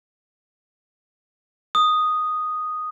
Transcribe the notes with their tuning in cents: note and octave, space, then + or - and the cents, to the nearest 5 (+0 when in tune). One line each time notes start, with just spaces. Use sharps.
D#6 -5